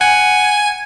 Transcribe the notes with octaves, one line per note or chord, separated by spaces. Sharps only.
F#5 G#5